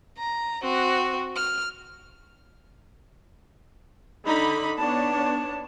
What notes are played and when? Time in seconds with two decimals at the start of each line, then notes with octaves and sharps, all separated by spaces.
0.17 A#5
0.62 C4 F#4
1.36 F6
4.26 D3 D#4 B5
4.78 B3 D4 C#5 A5